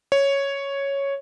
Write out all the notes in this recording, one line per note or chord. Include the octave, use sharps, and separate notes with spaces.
C#5